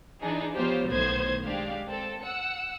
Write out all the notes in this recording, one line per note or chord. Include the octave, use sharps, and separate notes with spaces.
E3 D4 D#4 G#4
F3 B3 F4 G4 C5 C#5
B1 A2 D#3 B3 C5 G#6
G#3 D4 G4 F5
C4 A4
F#5 E6 C#7